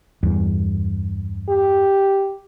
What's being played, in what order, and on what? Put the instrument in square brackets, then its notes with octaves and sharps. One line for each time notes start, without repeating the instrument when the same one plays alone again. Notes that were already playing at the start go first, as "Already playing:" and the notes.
[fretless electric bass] E2 G2
[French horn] G4